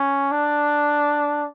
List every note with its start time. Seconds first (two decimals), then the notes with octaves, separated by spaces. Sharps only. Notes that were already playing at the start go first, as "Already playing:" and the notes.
Already playing: C#4
0.31 D4